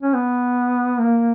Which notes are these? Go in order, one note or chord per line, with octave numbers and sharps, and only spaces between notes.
C#4
B3
A#3